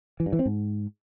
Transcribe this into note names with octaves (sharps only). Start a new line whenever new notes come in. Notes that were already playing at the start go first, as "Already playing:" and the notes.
E3
G2
E3
C4
G#2